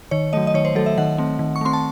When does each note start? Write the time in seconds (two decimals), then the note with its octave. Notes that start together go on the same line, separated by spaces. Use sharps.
0.11 D#3 C#5
0.33 F#3 A3 D#5
0.47 D#5
0.54 D#3 C#5
0.65 C5
0.75 F#3 A3 A4
0.86 E5
0.98 D#3 F#5
1.18 A3 C4
1.39 D#3
1.56 C#6
1.61 A3 C4 C6
1.73 A5